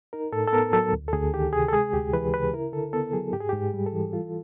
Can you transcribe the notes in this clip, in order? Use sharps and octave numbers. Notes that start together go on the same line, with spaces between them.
D#4 A#4
A2 A4
A4
B3 A#4
F#3 A4
D2
A4
D2 G#4
D#3 G4
C3 G#4
A4
G#3 G#4
D2 G4
E3 B4
C#3 B4
E4 A#4
D3 A4
B3 A4
F#3 G#4
G#2 G4
G#4
G4
G#2
G3
A4
E3
F4